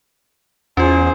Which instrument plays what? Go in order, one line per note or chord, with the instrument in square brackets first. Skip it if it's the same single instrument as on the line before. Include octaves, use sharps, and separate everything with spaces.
[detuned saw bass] E2 [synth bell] C#4 F4 [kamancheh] G#4 C5